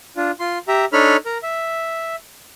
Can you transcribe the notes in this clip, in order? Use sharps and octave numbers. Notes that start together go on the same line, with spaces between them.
D4 F4
F4 C6
G4 E5 A#5
D4 D#4 A4 C#5 B5 F6
A#4 A#5
E5